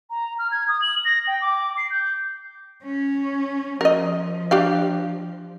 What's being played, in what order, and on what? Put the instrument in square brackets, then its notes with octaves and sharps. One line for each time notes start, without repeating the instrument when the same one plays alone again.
[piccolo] A#5
F6
G#6
D#6
F#7
A#6
G5
D6
C7
G6
[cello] C#4
[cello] F3 [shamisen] A#4 D#5
[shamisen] D4 G4 F5